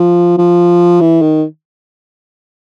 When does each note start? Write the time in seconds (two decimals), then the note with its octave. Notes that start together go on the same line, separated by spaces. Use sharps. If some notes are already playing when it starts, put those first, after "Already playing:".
Already playing: F3
0.38 F3
1.01 E3
1.21 D#3